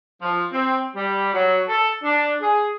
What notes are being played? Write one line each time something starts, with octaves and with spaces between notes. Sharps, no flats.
F3
C4
G3
F#3
A4
D4
G#4